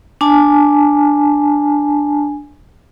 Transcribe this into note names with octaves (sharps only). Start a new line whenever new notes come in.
D4 G#5 A5